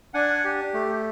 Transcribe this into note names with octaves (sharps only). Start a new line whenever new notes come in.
D4 F#5 G#5
G4
A3